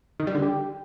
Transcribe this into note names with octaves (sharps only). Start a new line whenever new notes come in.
D#3
G3
D3
G4